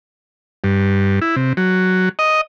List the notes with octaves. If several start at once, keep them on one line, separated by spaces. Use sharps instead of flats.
G2
E4
C3
F#3
D#5